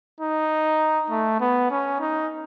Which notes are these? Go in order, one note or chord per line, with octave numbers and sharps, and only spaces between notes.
D#4
A3
B3
C#4
D#4